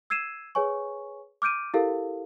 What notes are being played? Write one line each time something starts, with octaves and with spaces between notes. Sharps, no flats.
E6 G#6 C7 D#7 E7
G#4 B4 C#5 G#5 C#6
D6 F6 G6 D7 D#7
E4 G4 A4 A#4 F5